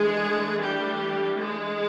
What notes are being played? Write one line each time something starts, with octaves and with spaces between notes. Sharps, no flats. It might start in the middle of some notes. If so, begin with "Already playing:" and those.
Already playing: E3 G#3 A3 D4 G#4
G3 G4
G#3 G#4